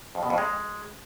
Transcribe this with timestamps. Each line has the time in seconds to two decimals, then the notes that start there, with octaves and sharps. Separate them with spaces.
0.15 F2
0.23 B2
0.30 F2
0.38 G#3